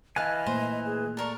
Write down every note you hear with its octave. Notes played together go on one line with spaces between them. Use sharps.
E3 B4 D#5 F5 G#5 A5
A#2 A3 A#3 C5
G#4
A4 A#4 D5 C#6